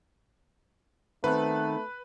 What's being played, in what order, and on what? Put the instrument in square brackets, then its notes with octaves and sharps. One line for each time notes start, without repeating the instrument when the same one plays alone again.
[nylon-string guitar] D#3 B3 C4 [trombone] A3 [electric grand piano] B4 F#6